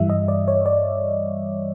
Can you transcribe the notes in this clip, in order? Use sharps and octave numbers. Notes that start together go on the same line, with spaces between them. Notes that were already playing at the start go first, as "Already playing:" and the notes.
Already playing: G2 E3 G3 E5
D#5
D5
C#5
D5